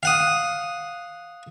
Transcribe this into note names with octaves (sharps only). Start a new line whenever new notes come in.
F5 F#5 D#6